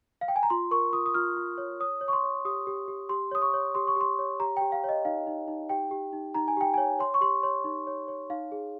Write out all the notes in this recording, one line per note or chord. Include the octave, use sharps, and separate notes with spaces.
F5
G5
G#5
A#5
F4 C6
A#4 C#6
F4 D#6
D#6
F4 F6
F4
C#5
C#5 D#6
C#5
C#6
C6
C#5
G4 D#6
G4
G4
G4 C6
C#5 D#6
C#6
C#5
G4 C6
C#6
G4 C6
C#5
G4 A#5
G4 G5
F5
C#5 D#5
D#4 F5
D#4
D#4
G4 G5
G4
D#4
D#4 A#5
G#5
G4 G5
C#5 G#5
C#5 C6
C#6
G4 C6
C#5 C6
D#4
C#5
C#5
D#4 F5
G#4